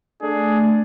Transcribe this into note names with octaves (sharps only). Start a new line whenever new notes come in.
A3 D4 G#4